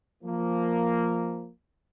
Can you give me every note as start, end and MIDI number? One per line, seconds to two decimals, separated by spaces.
0.24 1.49 53
0.24 1.49 58